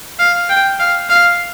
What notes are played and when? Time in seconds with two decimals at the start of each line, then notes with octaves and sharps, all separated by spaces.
0.19 F5
0.49 G5
0.79 F5
1.09 F5